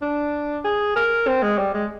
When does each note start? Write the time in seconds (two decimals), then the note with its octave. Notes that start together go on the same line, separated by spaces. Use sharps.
0.02 D4
0.64 G#4
0.96 A#4
1.27 C4
1.42 G#3
1.58 G3
1.74 G#3